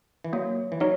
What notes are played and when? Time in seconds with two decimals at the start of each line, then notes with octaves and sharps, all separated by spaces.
0.24 E3
0.33 F#3 A#3
0.72 E3
0.80 F#3 D#4 C#5